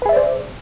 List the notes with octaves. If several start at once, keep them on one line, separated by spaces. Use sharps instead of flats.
G#4 B4 C5 D5 E5